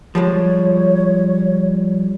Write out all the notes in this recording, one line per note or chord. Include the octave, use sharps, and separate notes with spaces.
F3 G3 G#3 C#5